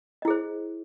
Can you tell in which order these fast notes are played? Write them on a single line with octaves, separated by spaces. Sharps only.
D#5 E4 G#4 C5